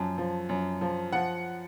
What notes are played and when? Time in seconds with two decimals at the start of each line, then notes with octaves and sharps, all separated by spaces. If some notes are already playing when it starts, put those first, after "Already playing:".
Already playing: F#2 F3 A5
0.18 F3
0.49 F#2
0.81 F3
1.13 F3 F#5